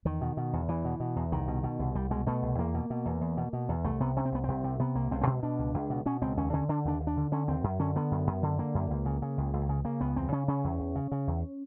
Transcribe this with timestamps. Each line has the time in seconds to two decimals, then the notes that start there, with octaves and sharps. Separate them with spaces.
0.05 E2 D#3
0.21 B2
0.37 B2
0.53 E2
0.68 E2 E3
0.85 B2
1.00 B2
1.16 E2
1.32 C2 D#3
1.48 B2
1.63 B2
1.79 C2
1.95 C2 G3
2.11 B2 G#3
2.27 B2 A3
2.42 C2
2.58 E2 A#3
2.74 B2
2.90 B2
3.05 E2
3.21 E2
3.37 B2
3.53 B2
3.69 E2
3.84 C2 A3
4.00 C3 B3
4.16 C3 C#4
4.25 C4
4.32 C2 B3
4.44 C2 C4
4.64 C3
4.79 C3 B3
4.95 C2 A#3
5.11 C#2 C4
5.21 C4
5.27 B2
5.43 B2 D4
5.59 C#2
5.74 C#2
5.90 B2
6.06 B2 C#4
6.22 C#2 C4
6.37 D#2 C#4
6.53 D3 C#4
6.69 D3 D4
6.85 D#2 D4
7.00 D#2
7.07 D4
7.17 D3
7.32 D3 C#4
7.48 D#2 C4
7.64 F#2
7.79 D3 C#4
7.96 D3 B3
8.11 F#2
8.27 F#2
8.43 D3
8.58 D3 A#3
8.75 F#2
8.90 C#2
9.06 C#3
9.22 C#3
9.38 C#2
9.53 C#2
9.69 C#3
9.85 C#3 A#3
10.01 C#2 B3
10.16 E2 C4
10.32 C#3 C#4
10.48 C#3 C#4
10.64 E2
10.80 E2
10.95 C#3
11.12 C#3
11.27 E2